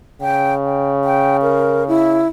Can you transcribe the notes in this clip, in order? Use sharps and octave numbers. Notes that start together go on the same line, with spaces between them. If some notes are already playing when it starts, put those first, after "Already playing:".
C#3 G5
G5
G5
A#4
E4